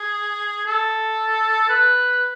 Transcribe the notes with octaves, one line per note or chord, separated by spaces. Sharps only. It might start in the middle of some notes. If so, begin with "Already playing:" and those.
Already playing: G#4
A4
B4